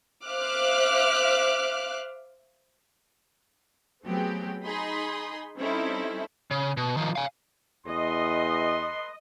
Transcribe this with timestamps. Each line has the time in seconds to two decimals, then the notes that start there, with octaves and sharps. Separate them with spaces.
0.25 C5 E5 F5 D6 F6 F#6
4.05 F#3 A3 B3 C4 G4 G#4
4.64 D#4 G#4 B5 C6 D#6
5.58 G3 C4 C#4 D#4 E4 A4
6.51 C#3
6.77 B2
6.97 D#3 F3
7.16 F5 G#5
7.87 E2 A4 B4 D#5 C6